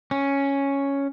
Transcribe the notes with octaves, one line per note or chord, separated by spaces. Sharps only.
C#4